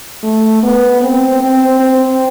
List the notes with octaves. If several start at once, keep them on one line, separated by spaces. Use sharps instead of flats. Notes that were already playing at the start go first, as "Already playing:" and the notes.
A3
B3
C4
C4
C4